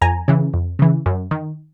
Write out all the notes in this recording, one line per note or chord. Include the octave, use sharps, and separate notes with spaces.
F2 G#5 A#5
C#3 E3
F2
C#3 E3
F#2
D#3